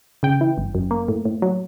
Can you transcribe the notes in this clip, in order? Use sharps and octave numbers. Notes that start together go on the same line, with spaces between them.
C#3 G5
E3
G1
F#2
A#3
A2
A2
F#3